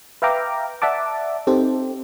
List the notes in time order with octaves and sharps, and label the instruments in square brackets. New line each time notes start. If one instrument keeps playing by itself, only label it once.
[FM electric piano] B4 E5 F5 G5 A#5 D6
D5 E5 F#5 A5 D6
C4 D#4 G4 A4 C5